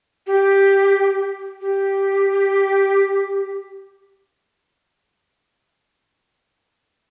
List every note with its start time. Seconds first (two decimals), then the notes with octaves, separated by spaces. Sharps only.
0.27 G4
1.61 G4